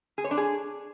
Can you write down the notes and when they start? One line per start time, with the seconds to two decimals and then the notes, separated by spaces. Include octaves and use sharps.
0.18 G#4
0.24 C#5
0.31 D4
0.38 G#4